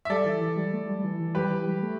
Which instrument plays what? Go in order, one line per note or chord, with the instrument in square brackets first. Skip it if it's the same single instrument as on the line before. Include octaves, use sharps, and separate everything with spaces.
[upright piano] E5
[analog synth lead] G3 [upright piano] A4 D5
[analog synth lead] E3
E3
G3
A3
G3
E3
E3
[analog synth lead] G3 [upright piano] G4 B4
[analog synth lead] E3
G3
A3